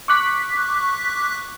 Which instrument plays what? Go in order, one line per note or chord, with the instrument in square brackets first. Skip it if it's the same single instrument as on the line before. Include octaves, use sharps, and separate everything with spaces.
[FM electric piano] C#6 D6 F#6 B6